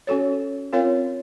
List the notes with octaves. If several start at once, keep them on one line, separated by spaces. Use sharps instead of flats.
C#4 F#4 A4 C#5
C4 F4 A#4 C#5 F5